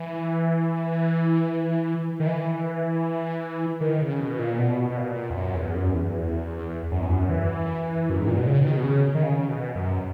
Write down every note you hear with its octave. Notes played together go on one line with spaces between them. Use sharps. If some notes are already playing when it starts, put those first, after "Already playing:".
Already playing: E3
D#3
E3
D#3
C#3
B2
A#2
B2
B2
A#2
E2
F#2
E2
F#2
E2
F#2
E2
F#2
E3
F#2
G#2
A#2
B2
C#3
D#3
B2
C#3
D#3
C#3
C#3
B2
F#2